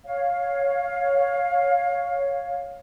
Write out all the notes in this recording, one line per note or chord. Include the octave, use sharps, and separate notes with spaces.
C#5 F5